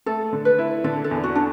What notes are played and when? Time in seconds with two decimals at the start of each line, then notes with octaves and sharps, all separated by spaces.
0.06 A3 A4
0.33 D3
0.45 B4
0.59 E4
0.84 D3 A4
1.04 A4
1.11 E2
1.24 F#4
1.35 D4